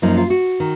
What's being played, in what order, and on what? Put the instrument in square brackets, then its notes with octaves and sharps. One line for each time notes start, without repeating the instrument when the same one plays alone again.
[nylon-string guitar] F#2 F3 A#3 D#4
F4
F#4
D#3